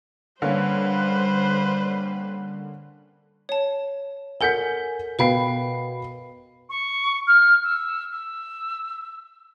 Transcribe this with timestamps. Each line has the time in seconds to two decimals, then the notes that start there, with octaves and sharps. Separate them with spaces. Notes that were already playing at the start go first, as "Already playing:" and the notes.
0.42 D3 G3 A#3 C#4 B4 C5
3.49 C#5 A5
4.41 A4 A#4 F#5 G#5 G6 B6
5.19 B2 B4 F5 G5 B5 C7
6.69 C#6
7.27 F6
7.63 E6
8.12 E6